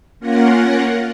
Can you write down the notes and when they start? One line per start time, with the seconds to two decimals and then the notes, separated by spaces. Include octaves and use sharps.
0.19 A#3 C#4 F4 A#4 F#5